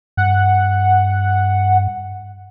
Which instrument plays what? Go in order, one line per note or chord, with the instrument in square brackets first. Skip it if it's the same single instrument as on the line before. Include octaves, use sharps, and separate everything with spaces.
[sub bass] G2 [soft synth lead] F#5